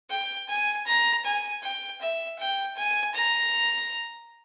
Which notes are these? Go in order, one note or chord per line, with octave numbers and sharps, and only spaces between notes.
G5
G#5
A#5
G#5
G5
E5
G5
G#5
A#5